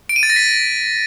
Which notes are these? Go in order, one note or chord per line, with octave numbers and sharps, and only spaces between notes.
D7
D#7
A6
A#6
B6